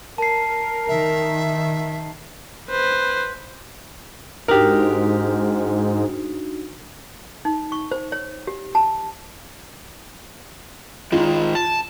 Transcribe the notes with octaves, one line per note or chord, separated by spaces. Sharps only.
A#4 A5 C7
D#3 E5
B4 C5
G#2 D4 D#4 F#4 G4 A#4
D#4
C#6
C5
C#5
G4
A5
D#3 G#3 F4
A5